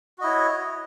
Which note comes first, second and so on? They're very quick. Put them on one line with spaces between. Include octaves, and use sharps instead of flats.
F#4 D#5 E4 C#5